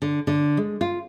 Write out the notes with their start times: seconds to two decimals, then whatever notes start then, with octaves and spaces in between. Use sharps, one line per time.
0.02 D3
0.27 D3
0.57 G#3
0.81 F4